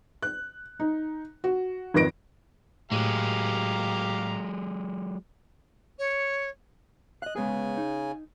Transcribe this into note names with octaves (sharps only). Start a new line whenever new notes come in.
F#6
D#4
F#4
G#1 F2 D#3 B4 A#6 D7
A2 F#3 G#3 G4 F5 A#5
C#5
D#5 F5 F#6
C#3 G#3 B3 G#4 G#5
D#4